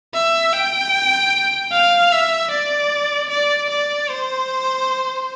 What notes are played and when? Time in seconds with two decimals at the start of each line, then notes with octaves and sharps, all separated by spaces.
0.14 E5
0.53 G5
1.72 F5
2.12 E5
2.51 D5
3.30 D5
3.70 D5
4.09 C5